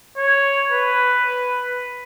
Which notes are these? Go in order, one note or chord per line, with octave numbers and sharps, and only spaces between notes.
C#5
B4